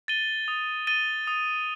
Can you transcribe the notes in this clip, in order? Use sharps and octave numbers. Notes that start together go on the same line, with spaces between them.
A6 D#7 G7
D#6
A6 D#7 G7
D#6